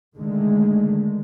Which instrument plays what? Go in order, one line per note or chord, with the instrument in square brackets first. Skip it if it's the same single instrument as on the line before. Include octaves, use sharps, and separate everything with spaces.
[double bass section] D3 D#3 G#3 A3